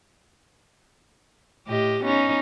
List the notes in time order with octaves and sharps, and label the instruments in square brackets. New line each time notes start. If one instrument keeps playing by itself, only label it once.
[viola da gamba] A2 G4 D#5
B3 C#4 D#4